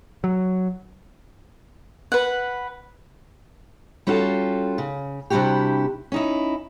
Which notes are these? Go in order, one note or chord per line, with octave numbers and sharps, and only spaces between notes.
F#3
B4 F#5
G3 C#4 F4 F#4 A4
C#3
C3 G3 D4 E4 F#4 G4
C#4 D#4 E4